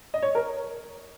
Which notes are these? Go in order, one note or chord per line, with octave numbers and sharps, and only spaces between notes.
D#5
C#5
A#4